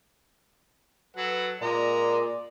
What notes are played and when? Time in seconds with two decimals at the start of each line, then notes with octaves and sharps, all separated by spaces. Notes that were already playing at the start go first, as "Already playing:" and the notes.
1.17 F#3 A4 B4 F#5
1.62 A#2 G#3 D5 A#5
2.11 D5